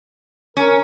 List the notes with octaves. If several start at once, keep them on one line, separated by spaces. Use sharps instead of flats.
C#4 A#4